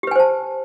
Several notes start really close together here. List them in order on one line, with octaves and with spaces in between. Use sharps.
G4 B4 G#5 C5 A5